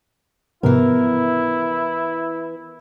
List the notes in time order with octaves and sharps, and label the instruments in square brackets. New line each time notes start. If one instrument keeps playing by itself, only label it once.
[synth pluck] G#2 C3 F3 [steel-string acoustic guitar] E3 A#4 [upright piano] B3 [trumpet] E4